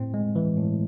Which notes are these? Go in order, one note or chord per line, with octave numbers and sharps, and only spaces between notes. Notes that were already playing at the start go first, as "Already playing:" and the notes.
Already playing: A2 C4
G#3
E3
A2